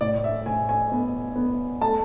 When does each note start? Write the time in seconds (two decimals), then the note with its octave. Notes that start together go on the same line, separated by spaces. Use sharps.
0.01 A2 D5
0.24 E5
0.46 A2 G#5
0.69 G#5
0.91 B3
1.36 B3
1.81 A3 A5